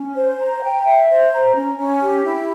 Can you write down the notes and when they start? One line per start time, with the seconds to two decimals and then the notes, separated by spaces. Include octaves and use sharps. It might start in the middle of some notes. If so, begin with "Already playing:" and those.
Already playing: C#4
0.15 C5
0.39 A#5
0.62 G5
0.84 E5
1.09 C5
1.32 A#5
1.55 C#4
1.77 C#4
2.01 G4
2.24 E4